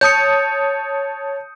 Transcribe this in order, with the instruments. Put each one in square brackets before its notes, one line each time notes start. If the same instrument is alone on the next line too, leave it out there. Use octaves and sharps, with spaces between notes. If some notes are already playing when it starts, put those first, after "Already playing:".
[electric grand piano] C#5 A5 D#6 [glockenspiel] G6 C#7